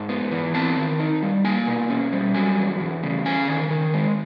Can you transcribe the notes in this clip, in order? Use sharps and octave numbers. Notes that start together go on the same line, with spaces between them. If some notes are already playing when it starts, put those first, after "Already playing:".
Already playing: G#2 A5
B3
E3
C4 A5
D#3
D#4
G3
A#3 G#5
B2
C#4
G3
F#3 G#5
E2
E2
C#3
C#4 G#5
D#3
D#3
G#3